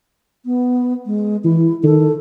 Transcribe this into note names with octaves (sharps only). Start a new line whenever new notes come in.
B3
G#3
E3 E4
D#3 A4